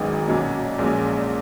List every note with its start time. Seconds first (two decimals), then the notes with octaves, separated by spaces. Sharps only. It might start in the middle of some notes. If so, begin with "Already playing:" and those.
Already playing: G#1 F#2 D#3 G#3 B3
0.28 B1 A#2 F#3 C#4
0.78 A#1 A#2 G#3 C#4